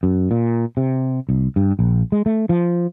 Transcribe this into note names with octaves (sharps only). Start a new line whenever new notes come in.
F#2
A#2
C3
C2
G2
A#1
G#3
A3
F3